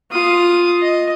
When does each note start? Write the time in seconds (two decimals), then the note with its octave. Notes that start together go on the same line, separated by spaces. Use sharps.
0.11 F4 D#6
0.82 D#5